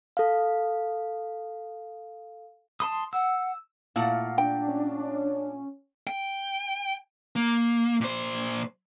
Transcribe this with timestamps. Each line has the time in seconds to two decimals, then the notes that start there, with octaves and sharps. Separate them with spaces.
0.17 A4 F5
2.80 A5 C6 D#6
3.13 F#5 E6
3.96 A#2 A3 E4 F5 F#5
4.38 D4 G5
4.68 C#4
6.07 G5
7.36 A#3
8.01 A#2 C5